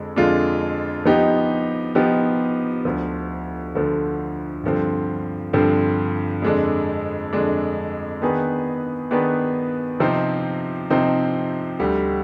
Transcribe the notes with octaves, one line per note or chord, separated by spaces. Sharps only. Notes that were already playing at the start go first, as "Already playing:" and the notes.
Already playing: F2 D3 G#3 D4
F2 D3 G#3 D4 F4
F3 B3 D#4 G4
F3 B3 D#4 G4
D2 D3 F3
D2 D3 F3
G2 D3 F3 C4
G2 D3 F3 C4
F2 D3 G#3 D4
F2 D3 G#3 D4
D#3 B3 D4 G#4 B4
D#3 B3 D4 G#4 B4
C3 F3 C4 D#4
C3 F3 C4 D#4
D2 D3 G3